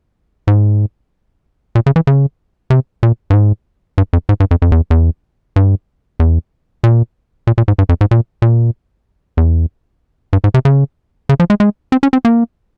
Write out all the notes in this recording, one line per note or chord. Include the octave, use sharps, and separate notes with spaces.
G#2
A#2
C#3
E3
C#3
C3
A#2
G2
G#2
G2
F2
G#2
G2
F2
F2
E2
E2
G2
E2
A#2
A#2
A#2
G#2
G2
F2
G#2
A#2
A#2
E2
G2
G#2
C3
C#3
C#3
F3
G#3
G#3
C4
C#4
C4
A#3